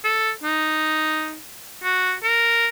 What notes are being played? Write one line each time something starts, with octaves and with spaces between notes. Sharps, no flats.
A4
D#4
F#4
A#4